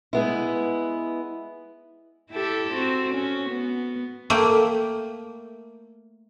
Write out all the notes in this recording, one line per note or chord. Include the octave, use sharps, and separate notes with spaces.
G#3 B3 E4
E4 G4 A4
C4 F#4
C#4 F#4
B3
A3 A#3 G5